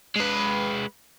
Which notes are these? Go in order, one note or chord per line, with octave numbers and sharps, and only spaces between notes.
G#3 B4